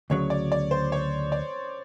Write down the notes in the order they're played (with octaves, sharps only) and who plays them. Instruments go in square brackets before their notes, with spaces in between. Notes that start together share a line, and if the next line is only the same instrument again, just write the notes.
[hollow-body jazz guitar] D2 C#3 F#3 [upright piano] C#5
[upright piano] D5
D5
C5
C#5
D5